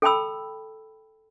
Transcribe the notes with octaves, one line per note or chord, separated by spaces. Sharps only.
A4 G5 A5 B5 E6